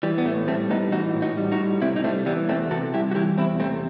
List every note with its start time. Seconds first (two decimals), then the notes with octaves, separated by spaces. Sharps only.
0.03 E3 G3
0.18 B3
0.25 A2 A3
0.48 G3 A3 C4
0.70 A2 B3 D#4
0.92 E3 D#4 F#4
1.14 A2
1.22 D#4 F#4
1.37 G3
1.52 D#4 F#4
1.59 A2
1.82 C3 C4 E4
1.96 D#4
2.04 G3 A3 C4
2.26 E3 G3 B3
2.48 E2 A3 C4
2.71 C3 F#4 A4
2.93 G3 E4 G4
3.11 F#4
3.15 E3 E4 G4
3.38 E2 C4 E4
3.60 C3 A3 C4